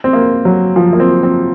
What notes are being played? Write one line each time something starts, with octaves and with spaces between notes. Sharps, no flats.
C4
A#3
F#3
F3
A#3
C4
C4